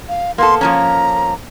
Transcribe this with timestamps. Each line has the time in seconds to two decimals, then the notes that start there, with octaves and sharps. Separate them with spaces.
0.09 F5
0.38 A#3 B3 A4 C6
0.61 F3 A#3 C#4 A#5